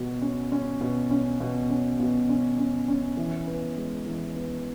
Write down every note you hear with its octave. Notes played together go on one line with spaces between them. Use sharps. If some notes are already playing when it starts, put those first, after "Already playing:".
Already playing: B2 F#4
C#4
C#4
B2
C#4
B2
C#4
B2
C#4
C#4
C#4
E3
B3
G#3
E3
B3